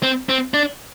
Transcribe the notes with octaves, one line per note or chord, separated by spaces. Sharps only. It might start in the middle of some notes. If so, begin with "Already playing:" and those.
C4
C4
D4